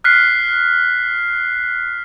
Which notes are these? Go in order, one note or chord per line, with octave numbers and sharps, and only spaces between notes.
F6 F#6 B6 C7